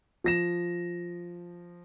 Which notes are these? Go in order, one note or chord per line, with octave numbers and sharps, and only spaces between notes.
F3 A#6 E7